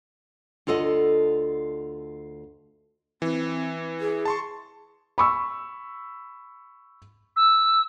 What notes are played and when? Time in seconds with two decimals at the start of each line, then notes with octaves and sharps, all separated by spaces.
0.67 D2 F4 A4 D#5 F#5
3.22 E3 C4
4.00 G#4
4.25 A5 C6 C#6
5.18 B5 C#6 E6
7.36 E6